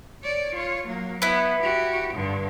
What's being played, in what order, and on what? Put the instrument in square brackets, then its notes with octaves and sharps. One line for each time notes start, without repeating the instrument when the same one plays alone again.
[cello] C#5 D5
F4 C#5
F#3 A#3
[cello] B3 [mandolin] E4 B4
[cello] F#4 G4
G2 D3